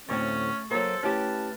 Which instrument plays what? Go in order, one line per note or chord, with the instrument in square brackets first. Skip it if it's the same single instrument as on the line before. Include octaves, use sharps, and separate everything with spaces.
[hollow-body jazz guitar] D2 A2 C4 [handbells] A3 C#6 A6 [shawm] C#4
[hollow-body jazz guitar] F#3 A#3 [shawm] A4 [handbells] C5
[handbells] A3 B4 F6 [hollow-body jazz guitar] C#4 E4 G4 [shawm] A5